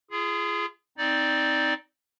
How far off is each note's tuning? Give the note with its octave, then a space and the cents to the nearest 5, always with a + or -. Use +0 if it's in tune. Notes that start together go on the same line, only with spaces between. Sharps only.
F4 -40 G#4 +0
C4 +0 D#4 +10 D5 +0